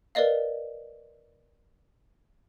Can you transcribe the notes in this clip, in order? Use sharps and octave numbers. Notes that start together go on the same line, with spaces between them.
A#4 B4 D5 D#5 F5